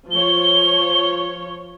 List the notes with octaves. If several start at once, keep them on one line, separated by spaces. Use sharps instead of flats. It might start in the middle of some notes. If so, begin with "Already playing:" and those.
F3 C#5 G7